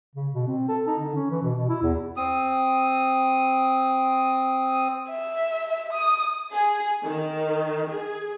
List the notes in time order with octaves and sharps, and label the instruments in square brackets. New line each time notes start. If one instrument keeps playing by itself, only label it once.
[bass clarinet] C#3
B2
C4
A4
D#4
D3
C#4
E3
B2
B2
E4
E2
[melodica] C4 D#6
[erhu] E5
D#6
[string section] G#4
D#3
G#4